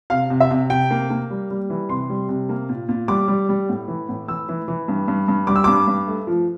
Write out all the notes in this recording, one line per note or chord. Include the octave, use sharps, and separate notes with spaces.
C3 F5
C3
E5
C3
C3 G5
A#3
A#3
G3
G3
E3
C3 C6
G3
C3
A#3
A#2
A#2
G3 D6
G3
G3
A2
E3
A2
E3 E6
E3
E3
G2
G2
G2
G3 D6
E6
G2 D6
G2
A3
F3